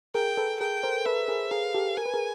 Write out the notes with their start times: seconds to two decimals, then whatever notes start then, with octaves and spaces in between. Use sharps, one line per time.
0.15 G#4 A#4 G5
0.37 A4 B4
0.60 G#4 A#4 G5
0.83 A#4 C5
1.06 A4 B4 E5
1.28 G#4 A#4
1.51 G#4 A#4 F5
1.74 G4 A4
1.97 A#4 G#5
2.06 B4
2.14 G#4 A#4